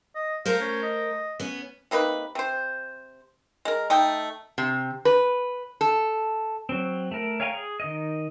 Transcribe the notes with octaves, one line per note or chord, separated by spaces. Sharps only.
D#5
A3 A#4 C5 F5
C#4
D#5
B3 C#4
C3 A#3 D#4 B4
C3 C5
G#3 A#4
A3 D#4 G5
C3
B4
A4
F#3 C4
A3 A#4
C#5 F5 G5 G#5 A#5
G#4
D#3 D#5